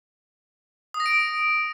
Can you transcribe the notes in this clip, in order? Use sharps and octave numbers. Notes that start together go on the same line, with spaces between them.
D#6
A#6
D7